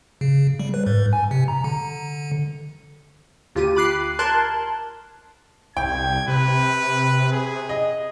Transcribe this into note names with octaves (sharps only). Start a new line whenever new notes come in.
C#3
G3
B4
G#2
G#5
C3
A#5
D3
D2 F4 G4 D#7
B5 D6 F#6 C7
A#4 A5 C6 F#6 G#6
C2 G5 G#6
C3 B4
G#4
D#5